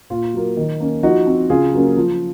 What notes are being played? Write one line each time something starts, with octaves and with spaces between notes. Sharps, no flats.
A#2 F4
F#3 A#3
D#3
A#3 C#4
F3 D#4 F#4
C4
C#3 F4 G#4
F#3 A#3 C#4
F3